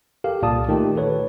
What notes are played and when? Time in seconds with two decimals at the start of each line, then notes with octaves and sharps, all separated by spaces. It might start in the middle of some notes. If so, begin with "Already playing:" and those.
0.24 G4 A4 A#4 F5
0.42 C2 A#2 D5 A5 D#6
0.69 D#3 A3 F4 G4 D#5
0.97 A4 B4 C#5